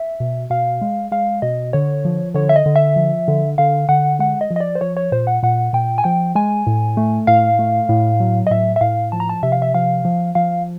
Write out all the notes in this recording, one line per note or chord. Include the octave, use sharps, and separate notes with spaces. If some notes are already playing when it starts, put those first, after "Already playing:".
Already playing: E5
B2
B2 F5
G#3
G#3 F5
B2 D#5
D3 C#5
F3
D3 C#5
E5
D#5
D3
E5
F3
D3
D3 F5
D3 F#5
G#3 F#5
D#5
F3
D#5
D5
C5
F3 C#5
C#5
A#2 C5
F#5
A#2 F#5
A#2 G5
G#5
F3 G5
G#3 G#5
A2
A3
A2 F5
A3
A2
F#3
D#5
A2 E5
E5
A2 F5
F3 A5
A#5
A5
C3 E5
F5
E5
F3 F5
F3
F3 F5